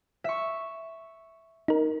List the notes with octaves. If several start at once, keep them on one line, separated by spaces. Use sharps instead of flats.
E5 C#6
D#4 A#4